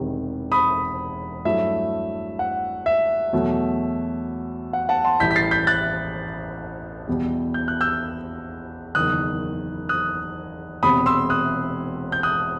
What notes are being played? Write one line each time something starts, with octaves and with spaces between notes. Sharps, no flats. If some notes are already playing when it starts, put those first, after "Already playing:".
Already playing: E1 E2 C3 D#3 G3
B5 D#6
G2 F#3 A3 E4 E5
F#5
E5
E2 B2 F#3 A3
F#5
F#5 A5
A5 C6
A1 A2 E3 G3 G6 B6
B6
A6 C7
G6 B6
F#6 A6
E2 B2 G3
G6
F#6
E6 G6
F#1 E2 D#3 D#6 F#6
D#6 F#6
E1 E2 C3 B5 D#6
C6 E6
D#6 F#6
G6
D#6 F#6